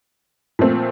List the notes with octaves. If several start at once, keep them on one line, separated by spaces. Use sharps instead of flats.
A#2 F3 A3 C4